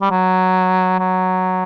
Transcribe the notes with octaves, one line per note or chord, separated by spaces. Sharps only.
G3
F#3
F#3